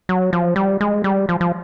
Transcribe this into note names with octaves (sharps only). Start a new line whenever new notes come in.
F#3
F3
G3
G#3
G3
F3
F3